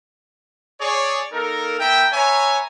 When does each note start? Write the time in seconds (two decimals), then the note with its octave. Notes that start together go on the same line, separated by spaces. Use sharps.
0.80 G#4 C#5 D5
1.33 A#3 D#4 A4 A#4
1.80 B3 A#4 E5 G5
2.13 B4 C#5 E5 G#5 A#5 C#6